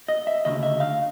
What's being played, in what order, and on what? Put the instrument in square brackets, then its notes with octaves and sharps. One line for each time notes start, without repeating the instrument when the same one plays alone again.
[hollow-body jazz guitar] D#5
E5
D2 C#3 D#5
E5
F5